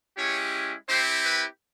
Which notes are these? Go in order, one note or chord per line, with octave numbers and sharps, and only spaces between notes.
G#3 C#4 E4 G4 C#5
C4 E4 G4 C5
B4